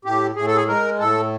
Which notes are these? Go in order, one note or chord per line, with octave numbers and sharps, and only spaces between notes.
A2 G4
A2 G#4
A4
G#4
G#3 A#4
A2 A4